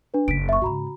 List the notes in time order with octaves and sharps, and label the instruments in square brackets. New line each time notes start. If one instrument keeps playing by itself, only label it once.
[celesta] D4 B4
[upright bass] F#1 C#3 [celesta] B6 D7
[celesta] E5 C#6
[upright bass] G#2 C#3 [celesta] F#4 A#5 B5